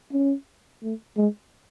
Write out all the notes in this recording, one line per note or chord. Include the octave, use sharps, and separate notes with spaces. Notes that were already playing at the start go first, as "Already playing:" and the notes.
C#4
A3
G#3